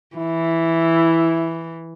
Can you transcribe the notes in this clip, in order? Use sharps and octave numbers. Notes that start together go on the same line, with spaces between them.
E3 E4